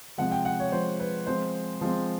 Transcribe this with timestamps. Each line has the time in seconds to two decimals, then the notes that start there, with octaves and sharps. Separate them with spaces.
0.18 C3 F3 G#3 F#5
0.31 G5
0.45 F#5
0.60 C#5
0.72 C3 F3 G#3 C5
1.00 B4
1.27 F3 G#3 C4 C5
1.81 F3 G#3 C4